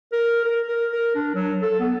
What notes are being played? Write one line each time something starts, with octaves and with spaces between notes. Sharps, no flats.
A#4
A#4
A#4
A#4
D4
F#3
A4
B3